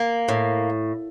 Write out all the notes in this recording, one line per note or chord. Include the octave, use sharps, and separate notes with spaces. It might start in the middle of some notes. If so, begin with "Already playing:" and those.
Already playing: A#3
A2